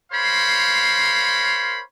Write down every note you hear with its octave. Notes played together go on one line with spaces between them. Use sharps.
A#4 C5 C#5 F5 B5 C6